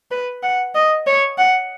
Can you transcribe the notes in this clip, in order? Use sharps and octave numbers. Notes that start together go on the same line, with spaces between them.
B4
F#5
D#5
C#5
F#5